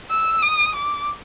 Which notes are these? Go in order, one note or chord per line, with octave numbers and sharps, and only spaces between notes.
E6
D#6
D6